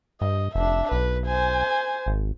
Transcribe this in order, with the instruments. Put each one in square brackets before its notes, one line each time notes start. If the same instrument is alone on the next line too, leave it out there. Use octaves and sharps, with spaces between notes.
[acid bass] G2 [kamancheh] D#5
[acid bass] F1 [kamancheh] D4 E5
[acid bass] B1 [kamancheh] B4
[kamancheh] C5 G#5
[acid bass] G#1